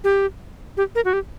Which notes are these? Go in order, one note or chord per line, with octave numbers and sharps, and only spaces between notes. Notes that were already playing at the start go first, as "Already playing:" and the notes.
G4
G4
A#4
F#4
G4